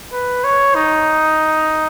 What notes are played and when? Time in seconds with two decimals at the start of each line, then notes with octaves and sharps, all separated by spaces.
0.12 B4
0.44 C#5
0.75 D#4